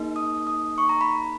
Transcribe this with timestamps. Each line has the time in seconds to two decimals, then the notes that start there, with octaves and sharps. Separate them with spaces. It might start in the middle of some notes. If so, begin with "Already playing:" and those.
Already playing: A#3 D#4 G#4
0.16 D#6
0.47 D#6
0.78 C#6
0.89 A#5
1.01 B5